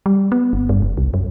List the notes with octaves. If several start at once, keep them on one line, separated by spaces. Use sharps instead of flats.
G3
B3
G1
G2
F#1
C2
F#2